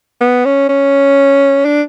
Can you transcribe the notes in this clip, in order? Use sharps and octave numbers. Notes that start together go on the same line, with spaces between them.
B3
C#4
C#4
D4